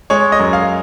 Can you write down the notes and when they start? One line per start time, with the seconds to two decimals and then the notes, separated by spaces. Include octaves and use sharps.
0.10 G#3 C#5
0.32 D#5
0.39 F#2
0.53 F5